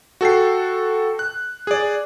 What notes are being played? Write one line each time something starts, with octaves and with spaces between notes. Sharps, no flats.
F#4 A4 G5 C7
F#6
G#4 D5